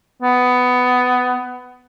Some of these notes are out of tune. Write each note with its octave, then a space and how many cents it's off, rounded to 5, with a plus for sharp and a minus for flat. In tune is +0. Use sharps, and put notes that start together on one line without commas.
B3 +15